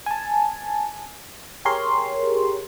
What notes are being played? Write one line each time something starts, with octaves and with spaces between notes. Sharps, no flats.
G#5 A5
G4 G#4 A#4 C#5 C6